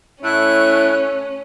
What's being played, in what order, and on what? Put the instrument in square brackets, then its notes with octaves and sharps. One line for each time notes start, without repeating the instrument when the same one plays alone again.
[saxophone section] A2 A3 E4 [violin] C#4 [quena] F#6